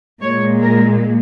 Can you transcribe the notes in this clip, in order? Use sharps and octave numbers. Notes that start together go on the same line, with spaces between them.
A#2 G#3 C#5
A#4